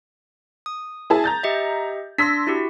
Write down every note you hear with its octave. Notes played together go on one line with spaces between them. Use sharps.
D#6
E4 G#4 A5
A#5 G6 A6
G4 D#5 E5
D4 C6 E6 A#6 B6
E4 F#4 G4